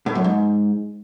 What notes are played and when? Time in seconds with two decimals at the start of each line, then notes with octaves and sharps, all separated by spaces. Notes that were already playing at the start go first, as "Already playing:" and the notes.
0.06 A2
0.15 F#2
0.24 G#2